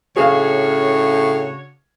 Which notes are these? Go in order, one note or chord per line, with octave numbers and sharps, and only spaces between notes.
A2 C#3 D4 F#4 G#4 C#5 F5